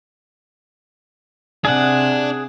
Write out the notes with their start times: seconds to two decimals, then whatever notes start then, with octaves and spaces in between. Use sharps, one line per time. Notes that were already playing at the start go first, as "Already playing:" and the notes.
1.65 C3 D4 G#4 D5 F#5